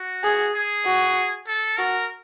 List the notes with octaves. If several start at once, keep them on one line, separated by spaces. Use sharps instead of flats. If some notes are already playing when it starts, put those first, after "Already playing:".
Already playing: F#4
G#4
G#4
F#4
A4
F#4 A#4